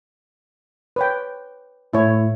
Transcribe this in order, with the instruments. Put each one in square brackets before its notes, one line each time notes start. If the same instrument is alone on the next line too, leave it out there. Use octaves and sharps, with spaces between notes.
[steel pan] B4 C#5 G5
[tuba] A2 [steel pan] E4 C#5